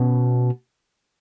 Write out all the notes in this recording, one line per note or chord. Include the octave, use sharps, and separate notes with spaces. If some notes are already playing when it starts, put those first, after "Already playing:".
Already playing: B2 C#4